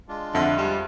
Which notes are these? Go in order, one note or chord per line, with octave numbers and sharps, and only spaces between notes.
G#3 D4 F4
F2 D3 E5 F#5 C6
G3